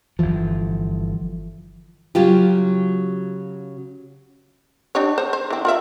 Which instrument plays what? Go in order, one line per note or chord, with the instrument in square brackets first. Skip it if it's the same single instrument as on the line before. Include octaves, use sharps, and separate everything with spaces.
[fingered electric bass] G1 C#2 E3 F3
[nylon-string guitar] C#3 F#3 F4 G4
[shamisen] D4 G4 C#5
C5 C#5
C5
E3 C4
F4 A#4 E5